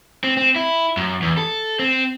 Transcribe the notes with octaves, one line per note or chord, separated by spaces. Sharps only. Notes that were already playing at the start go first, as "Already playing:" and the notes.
C4
C4
E4
F#2
E2
A4
C4